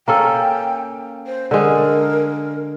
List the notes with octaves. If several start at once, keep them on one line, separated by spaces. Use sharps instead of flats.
A#3 C#4 A4 G5
C5
D3 G#3 A#4